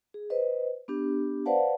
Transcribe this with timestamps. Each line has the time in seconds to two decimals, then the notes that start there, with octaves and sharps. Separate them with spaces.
0.14 G#4
0.30 B4 C5 D#5
0.88 B3 D4 G4
1.46 B4 C5 D5 F5 F#5 A5